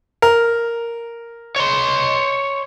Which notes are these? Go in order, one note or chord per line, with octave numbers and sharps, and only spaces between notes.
A#4
C#5 C6